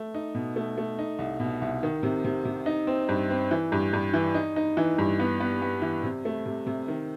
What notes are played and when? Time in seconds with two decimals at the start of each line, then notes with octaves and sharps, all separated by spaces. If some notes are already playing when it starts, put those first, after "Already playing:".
Already playing: A3
0.14 D#4
0.35 B2
0.56 A3
0.78 A3
0.99 D#4
1.19 C2
1.40 B2
1.62 C2
1.83 D#3
2.03 C3
2.25 C3
2.45 C3
2.66 D#4
2.87 C4
3.09 G2
3.30 C4
3.51 E3
3.72 G2
3.93 G2
4.14 E3
4.34 D#4
4.56 D#4
4.77 E3
4.98 G2
5.20 B3
5.40 B3
5.62 B3
5.82 E3
6.03 C3
6.25 A3
6.46 C3
6.67 C3
6.88 D#3